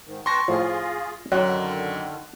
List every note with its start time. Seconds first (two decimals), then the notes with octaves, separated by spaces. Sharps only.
0.06 G#2 D#3
0.26 B4 G5 A5 C6 C#6 A#6
0.48 A2 F3 F4 G#4
1.32 F#2 D3 D#3 F#3 F#6